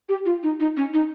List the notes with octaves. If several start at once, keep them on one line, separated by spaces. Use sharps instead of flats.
G4
F4
D#4
D#4
C#4
D#4